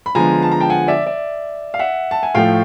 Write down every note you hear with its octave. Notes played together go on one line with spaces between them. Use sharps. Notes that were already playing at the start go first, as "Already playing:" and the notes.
B5
D3 F3 G#3 B3 G#5 A#5
A5
A#5
G5 A5
F#5 G#5
D5 E5
D5 E5
F5
E5 F#5
A5
G#5
A2 F3 A3 F5 G5